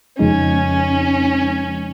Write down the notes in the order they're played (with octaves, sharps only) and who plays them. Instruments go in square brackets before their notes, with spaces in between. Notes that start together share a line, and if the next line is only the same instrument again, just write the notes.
[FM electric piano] F2 C#3 F3 G#3 D#4 [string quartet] C#4